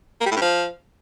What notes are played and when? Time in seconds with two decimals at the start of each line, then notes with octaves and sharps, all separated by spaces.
0.21 A#3
0.26 G3
0.31 A2
0.36 G2
0.42 F3